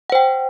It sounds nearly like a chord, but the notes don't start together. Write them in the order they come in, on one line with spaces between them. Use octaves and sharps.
F#5 C5 G5